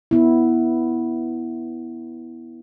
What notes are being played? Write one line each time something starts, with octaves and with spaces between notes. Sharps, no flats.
B3 E4